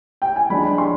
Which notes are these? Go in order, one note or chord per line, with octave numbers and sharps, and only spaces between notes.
G5
G#5
F3 G#3 D4 B5
C6